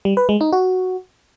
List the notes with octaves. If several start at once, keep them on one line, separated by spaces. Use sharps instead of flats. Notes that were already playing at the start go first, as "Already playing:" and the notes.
G3
B4
G#3
D#4
F#4